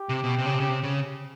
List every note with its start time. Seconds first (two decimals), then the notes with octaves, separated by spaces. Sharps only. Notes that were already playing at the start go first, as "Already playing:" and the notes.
Already playing: G4
0.09 C3
0.24 B2
0.38 C3
0.46 C#3
0.54 C3
0.60 C#3
0.68 C3
0.83 C#3